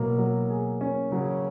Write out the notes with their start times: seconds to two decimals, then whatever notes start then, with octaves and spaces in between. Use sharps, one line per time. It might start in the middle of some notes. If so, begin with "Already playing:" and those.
Already playing: B2 F#3 A#3
0.18 F#3
0.50 G#4
0.81 C#4
1.11 C#3 F#3